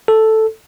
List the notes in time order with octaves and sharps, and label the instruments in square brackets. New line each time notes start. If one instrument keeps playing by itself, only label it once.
[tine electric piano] A4